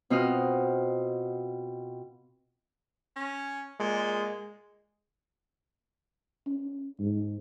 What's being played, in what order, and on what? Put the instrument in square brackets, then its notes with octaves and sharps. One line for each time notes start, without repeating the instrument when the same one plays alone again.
[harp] B2 C4 F4 D#5 F#5 F6
[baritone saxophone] C#4
[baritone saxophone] A#2 [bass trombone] G#3
[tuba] C#4
G#2